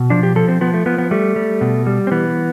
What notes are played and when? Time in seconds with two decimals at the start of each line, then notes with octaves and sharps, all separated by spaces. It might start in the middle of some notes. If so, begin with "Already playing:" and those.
Already playing: B2
0.10 F3 D4
0.23 G4
0.36 F3 A4
0.48 C4
0.61 F3 B3
0.74 A3
0.86 F3 B3
0.98 B3
1.11 G3 A3
1.36 G3
1.61 B2
1.87 G3
2.07 C4
2.11 E3 B3